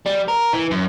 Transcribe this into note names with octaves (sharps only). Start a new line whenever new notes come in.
G3
A#4
E3
F#2